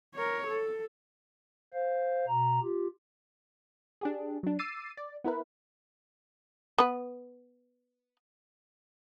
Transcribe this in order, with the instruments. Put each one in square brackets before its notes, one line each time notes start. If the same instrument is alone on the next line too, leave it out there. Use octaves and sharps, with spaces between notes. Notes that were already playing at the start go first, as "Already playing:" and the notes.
[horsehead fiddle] A#4 C#5
A4
[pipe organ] C5 F5
B2 A#5
F4 G4
[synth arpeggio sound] D4 G4 G#4
F#3 D4
D6 E6 A6 C7 D#7
D5
B3 E4 A#4 B4
[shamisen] B3 B4